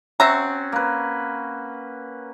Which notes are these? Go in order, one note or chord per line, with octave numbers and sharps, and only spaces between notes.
C4 C#4 F#4 E5 A#5 C#6
A#3 B4